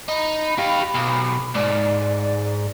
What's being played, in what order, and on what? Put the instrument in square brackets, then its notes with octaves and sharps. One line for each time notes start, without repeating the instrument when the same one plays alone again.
[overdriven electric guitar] D#4 [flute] B5
[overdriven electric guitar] G4 F5
B1
[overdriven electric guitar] G#2 [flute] D5